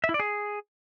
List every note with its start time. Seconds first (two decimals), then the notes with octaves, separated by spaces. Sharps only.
0.04 E5
0.09 E4
0.14 D5
0.20 G#4